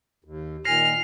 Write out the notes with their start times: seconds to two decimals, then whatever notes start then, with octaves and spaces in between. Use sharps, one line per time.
0.24 D#2
0.65 A#2 D#3 G#5 F6 A#6 C7 F7